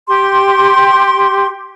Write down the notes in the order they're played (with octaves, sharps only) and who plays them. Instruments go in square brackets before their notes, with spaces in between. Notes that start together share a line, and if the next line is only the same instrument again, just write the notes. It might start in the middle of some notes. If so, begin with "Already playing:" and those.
[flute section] G4 C6